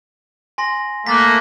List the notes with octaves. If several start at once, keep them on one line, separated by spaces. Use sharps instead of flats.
G#5 C6 A#6
A3 A#3 F#6 A6 B6